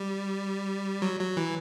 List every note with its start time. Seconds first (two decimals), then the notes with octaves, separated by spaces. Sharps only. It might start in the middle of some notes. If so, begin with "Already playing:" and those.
Already playing: G3
1.02 F#3
1.20 F#3
1.37 E3